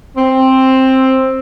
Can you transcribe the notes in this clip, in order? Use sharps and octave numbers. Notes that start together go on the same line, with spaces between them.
C4